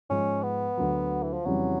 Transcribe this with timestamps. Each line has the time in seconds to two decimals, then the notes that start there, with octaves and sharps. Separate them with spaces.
0.09 G#2 F3 G#3 C#4
0.43 B3
0.77 D2 D3 F#3
1.23 E3
1.33 F3
1.45 F2 C#3 E3 F#3 G3